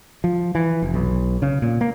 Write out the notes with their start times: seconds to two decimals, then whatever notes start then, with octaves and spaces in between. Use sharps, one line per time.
0.24 F3
0.55 E3
0.82 F1
0.94 B1
1.42 C#3
1.62 A#2
1.81 A#3